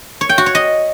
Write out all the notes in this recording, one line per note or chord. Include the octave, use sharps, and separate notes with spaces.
C#5
G5
F#4
C#5
D#5